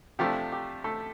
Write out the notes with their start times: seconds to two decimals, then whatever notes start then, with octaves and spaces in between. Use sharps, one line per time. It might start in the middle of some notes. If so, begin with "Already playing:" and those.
0.19 C3 F3 A3 D4 G4
0.52 G4
0.84 A3 A4